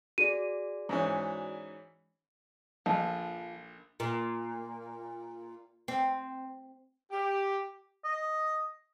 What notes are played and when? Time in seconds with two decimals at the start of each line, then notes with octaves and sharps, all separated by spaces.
0.18 F#4 G#4 D5 D#7
0.89 G#2 E3 C#4
2.86 A#1 D3 F3
4.00 A#2
5.88 C4
7.11 G4
8.04 D#5